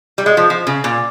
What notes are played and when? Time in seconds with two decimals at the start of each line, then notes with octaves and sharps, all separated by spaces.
0.18 G3
0.26 G#3
0.37 F3
0.50 F3
0.67 C#3
0.84 A#2